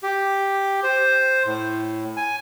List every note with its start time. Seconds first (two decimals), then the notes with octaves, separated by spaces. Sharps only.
0.03 G4
0.84 C5
1.46 A2
2.17 G#5